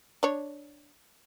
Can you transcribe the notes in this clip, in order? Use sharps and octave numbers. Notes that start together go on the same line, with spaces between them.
D4 C#5